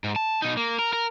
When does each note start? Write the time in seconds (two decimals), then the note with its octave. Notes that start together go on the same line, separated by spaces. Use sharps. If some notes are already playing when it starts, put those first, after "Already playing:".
0.04 G#2
0.16 A5
0.42 B2 D#4
0.57 A#3
0.79 A#4
0.93 A#4